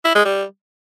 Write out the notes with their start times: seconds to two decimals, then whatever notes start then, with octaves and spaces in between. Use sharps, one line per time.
0.05 E4
0.15 G#3
0.25 G3